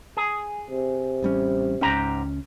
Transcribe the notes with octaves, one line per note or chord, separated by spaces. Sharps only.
G#4
C3
A1 G3 C#4
C#2 G#2 C#4 G4 A#5